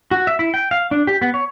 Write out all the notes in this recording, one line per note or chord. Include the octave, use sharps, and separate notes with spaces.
F#4
E5
E4
G5
F5
D4
G4
B3
C#5